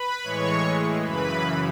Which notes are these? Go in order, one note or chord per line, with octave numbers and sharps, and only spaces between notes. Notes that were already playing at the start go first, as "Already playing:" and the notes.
Already playing: B4 B5
A2 E3 G#3 C#5 C#6
F#2 C#3 E3 B4 B5